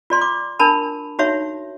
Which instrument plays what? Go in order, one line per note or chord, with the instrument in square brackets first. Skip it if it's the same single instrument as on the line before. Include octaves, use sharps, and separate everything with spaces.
[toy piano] F4 D5 C6
D6
D4 A#4 A5 B5
D#4 F#4 C#5 E5